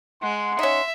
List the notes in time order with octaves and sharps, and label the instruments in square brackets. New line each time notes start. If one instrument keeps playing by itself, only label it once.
[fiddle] G#3 [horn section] F#5 C6
[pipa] C#4 D#4 [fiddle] E5